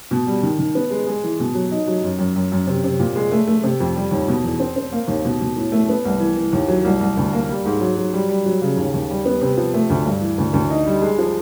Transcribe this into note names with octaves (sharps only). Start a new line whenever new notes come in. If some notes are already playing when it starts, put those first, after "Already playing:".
B2
G3
D#3
D#3
B3
G#3
G#3
E3
B2
F#3
D#4
F#3
F#2
F#2
F#2
F#2
C3
C3
A#2
G#3
A3
A3
C3
F2
G3
D#2
B2
E2
C4
C4
A#3
D#2
B2
B2
A2
A3
B3
C2
E3
E3
D#2
F#3
C2
C2
D2
A#3
G3
G#2
F#3
F#3
G3
G3
F#3
C#3
D#2
D#2
G3
B3
C3
F3
A3
D2
G2
E3
D2
D2
D#4
G3
G#3
F3